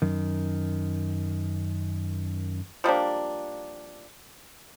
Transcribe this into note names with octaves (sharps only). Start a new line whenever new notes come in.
F#2 D#3
F3 G3 A#3 D4